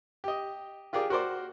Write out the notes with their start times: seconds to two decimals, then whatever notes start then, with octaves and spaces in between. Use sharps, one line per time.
0.24 G4 D#5
0.93 F4 G4 G#4 A#4 D5
1.10 F#4 A#4 C5 D5